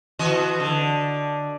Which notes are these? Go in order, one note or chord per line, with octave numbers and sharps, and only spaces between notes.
E3 F#4 D#5
D3